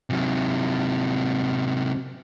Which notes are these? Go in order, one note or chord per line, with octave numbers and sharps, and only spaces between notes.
C3 F#3